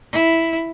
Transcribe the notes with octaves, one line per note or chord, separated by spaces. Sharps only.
E4